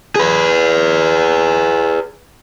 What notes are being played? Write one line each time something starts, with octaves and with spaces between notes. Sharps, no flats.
G#4 B4